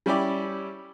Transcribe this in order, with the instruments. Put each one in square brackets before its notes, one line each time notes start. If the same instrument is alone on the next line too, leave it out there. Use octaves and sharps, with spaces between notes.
[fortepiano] G3 C#4 E4 G4 D5